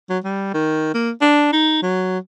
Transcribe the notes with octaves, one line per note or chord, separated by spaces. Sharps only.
F#3
G3
D#3
A#3
D4
D#4
F#3